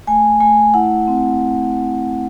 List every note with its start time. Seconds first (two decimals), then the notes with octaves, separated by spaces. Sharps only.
0.07 A3 G#5
0.41 A3 G#5
0.74 E4 F#5
1.07 C4